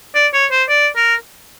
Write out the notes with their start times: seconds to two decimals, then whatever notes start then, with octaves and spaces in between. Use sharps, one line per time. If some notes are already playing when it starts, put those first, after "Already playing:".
0.15 D5
0.34 C#5
0.51 C5
0.69 D5
0.96 A#4